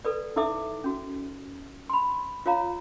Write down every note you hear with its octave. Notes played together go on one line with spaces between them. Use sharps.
A4 B4 D5
D#4 E4 A4 E5 D6
C#4 F#4
B5 C6
F4 C#5 F5 A#5